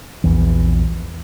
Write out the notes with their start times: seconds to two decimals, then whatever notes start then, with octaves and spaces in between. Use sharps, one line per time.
0.24 A#1 E2 E3